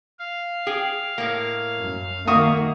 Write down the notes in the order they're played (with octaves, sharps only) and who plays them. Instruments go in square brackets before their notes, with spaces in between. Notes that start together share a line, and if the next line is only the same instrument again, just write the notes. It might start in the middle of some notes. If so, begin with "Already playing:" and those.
[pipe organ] F5
[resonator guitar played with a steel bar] G#4 G5
A2 A#3
[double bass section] F#2
[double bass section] D#3 A#3 [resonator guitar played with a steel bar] F#4 [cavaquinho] E5 C#6 D#6